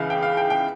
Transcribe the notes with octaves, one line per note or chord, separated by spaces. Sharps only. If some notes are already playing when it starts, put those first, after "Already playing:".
Already playing: C#2 C#3 E3 E5 F5
G5
F5
G5
G5